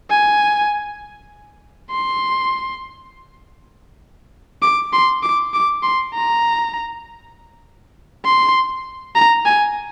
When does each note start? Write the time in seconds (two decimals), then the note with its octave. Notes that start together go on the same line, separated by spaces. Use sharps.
0.10 G#5
1.91 C6
4.62 D6
4.93 C6
5.23 D6
5.54 D6
5.83 C6
6.14 A#5
8.25 C6
9.16 A#5
9.45 G#5